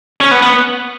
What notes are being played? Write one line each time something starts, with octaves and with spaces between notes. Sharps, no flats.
C#4
B3
B3